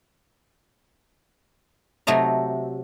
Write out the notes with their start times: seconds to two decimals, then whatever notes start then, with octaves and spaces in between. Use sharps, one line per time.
2.07 C3 F#3 A3 D#5 A#5